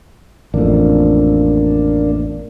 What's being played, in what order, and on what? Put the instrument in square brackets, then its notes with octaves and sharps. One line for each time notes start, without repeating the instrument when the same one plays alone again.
[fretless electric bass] A1 F2 [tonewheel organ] A#3 D4